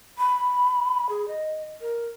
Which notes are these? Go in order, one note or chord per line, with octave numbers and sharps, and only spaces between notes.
B5
G#4
D#5
A#4